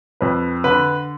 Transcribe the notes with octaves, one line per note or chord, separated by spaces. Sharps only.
F2 B4
D3 B4